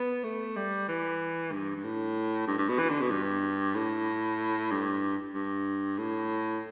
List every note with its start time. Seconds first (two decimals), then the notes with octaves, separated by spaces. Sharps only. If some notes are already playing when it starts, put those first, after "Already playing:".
Already playing: B3
0.24 A3
0.56 G3
0.89 E3
1.52 G2
1.75 G2
1.84 A2
2.47 G2
2.58 G2
2.69 B2
2.79 E3
2.89 D3
3.01 B2
3.11 G2
3.75 A2
4.71 G2
5.34 G2
5.98 A2